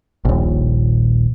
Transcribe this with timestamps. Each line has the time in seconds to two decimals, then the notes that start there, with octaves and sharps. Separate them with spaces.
0.25 D#1 A#1